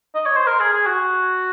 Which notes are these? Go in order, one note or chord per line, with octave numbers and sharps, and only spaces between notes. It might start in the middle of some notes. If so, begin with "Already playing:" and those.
D#5
C#5
C5
A#4
G#4
G#4
F#4